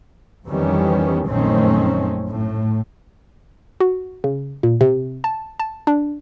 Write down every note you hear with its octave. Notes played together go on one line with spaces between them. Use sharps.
F2 D#3 E3 G3 B3 C#4
A#1 F#2 D#3 A3 C4 C#4
A2
F#4
C#3
A#2
C3
A5
A5
D4